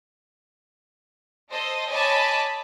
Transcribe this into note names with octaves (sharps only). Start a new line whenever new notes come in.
A4 C5 D#5
C#5 D#5 G#5 A5 B5 D6